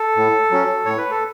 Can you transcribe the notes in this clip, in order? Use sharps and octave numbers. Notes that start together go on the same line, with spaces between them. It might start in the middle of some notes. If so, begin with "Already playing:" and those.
Already playing: A4
A2
F#3 C#4
A2 C#5
B4
A4